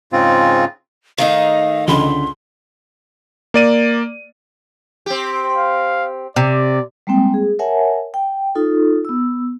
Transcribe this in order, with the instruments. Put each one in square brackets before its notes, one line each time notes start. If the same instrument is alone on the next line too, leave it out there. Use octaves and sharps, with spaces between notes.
[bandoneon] G#2 C#3 C4 F4
[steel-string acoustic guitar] D#3 A3 D#4 [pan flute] F5
[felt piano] C#2 D3 B5 [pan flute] C6
[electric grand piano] A#3 D5 D#7
[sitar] C4 G4
[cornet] F5
[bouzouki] C3 [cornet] D5
[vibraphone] G3 G#3 A#3 C4 G5
G#4
A#4 C#5 E5 F#5 G#5 A5
G5
D#4 F4 A4
B3 E6